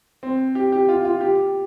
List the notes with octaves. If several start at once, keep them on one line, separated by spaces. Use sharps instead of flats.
C4
G4
G4
F4
F4
G4